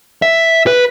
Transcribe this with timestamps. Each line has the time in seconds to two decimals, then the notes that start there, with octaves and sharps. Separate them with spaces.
0.22 E5
0.67 B4